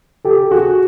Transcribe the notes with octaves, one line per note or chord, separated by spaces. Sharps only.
G4 A4
F#4 G#4